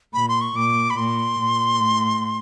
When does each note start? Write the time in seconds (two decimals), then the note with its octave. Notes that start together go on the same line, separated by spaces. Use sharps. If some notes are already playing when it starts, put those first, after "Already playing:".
0.14 A#2 B5
0.28 C6
0.41 C#6
0.55 A#2 D6
0.90 B5
0.97 A#2 C6
1.39 A#2
1.80 A2